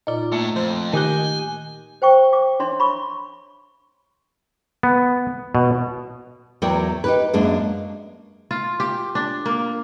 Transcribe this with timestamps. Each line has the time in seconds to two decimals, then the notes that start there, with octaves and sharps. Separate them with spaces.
0.07 A#2 D#4 F4 D5
0.32 A2 A3 A#3 E5
0.56 F2 C5
0.93 D#3 G4 D#5 G#5 D6 F#6 G6
2.02 C5 G5 C#6
2.33 D6
2.60 D4 C#5 E5 C6
2.80 B5 C#6
4.83 B3
5.55 B2
6.62 E2 F#3 A#4 D5 G5
7.04 D#4 G4 B4
7.33 F#2 G#3 A#3 D4
8.51 F4
8.80 G4
9.15 D4
9.46 A#3